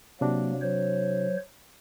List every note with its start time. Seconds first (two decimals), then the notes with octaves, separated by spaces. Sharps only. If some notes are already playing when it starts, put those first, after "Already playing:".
0.21 C3 F#3 A#3 D4 F#4
0.62 F#3 C5 C#5